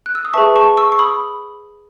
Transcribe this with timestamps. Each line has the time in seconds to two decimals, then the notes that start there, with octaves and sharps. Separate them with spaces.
0.06 F#6
0.15 E6
0.25 D#6
0.33 G#4 B4 E5 A5 C#6
0.56 A5 C#6
0.77 C#6 E6
0.92 C#6
0.99 B5 D#6